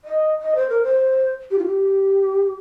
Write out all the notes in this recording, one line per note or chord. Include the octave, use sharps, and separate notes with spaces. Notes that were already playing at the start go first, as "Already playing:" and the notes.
D#5
D#5
C5
A#4
C5
G4
F4
G4